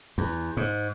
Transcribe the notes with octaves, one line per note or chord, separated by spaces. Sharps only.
E2
G#2